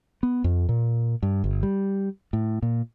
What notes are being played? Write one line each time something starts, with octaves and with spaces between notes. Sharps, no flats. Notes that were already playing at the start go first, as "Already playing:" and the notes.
B3
F2
A#2
G2
G1
G3
A2
A#2